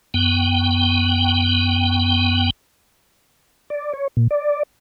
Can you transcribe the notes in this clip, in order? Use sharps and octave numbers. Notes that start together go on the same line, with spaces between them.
F#2 B3 G5
D5
C#5
A#2
D5